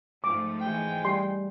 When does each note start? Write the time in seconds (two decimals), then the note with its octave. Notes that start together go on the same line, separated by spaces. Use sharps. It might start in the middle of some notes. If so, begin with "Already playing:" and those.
0.24 G#2 F3 A3 D6
0.61 E3 G#3 G5
1.05 G3 C6